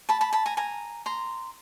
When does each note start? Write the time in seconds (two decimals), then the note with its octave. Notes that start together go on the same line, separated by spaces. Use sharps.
0.09 A5 B5
0.21 A5 B5
0.33 A5 B5
0.46 G#5 A#5
0.57 G#5 A#5
1.06 A#5 C6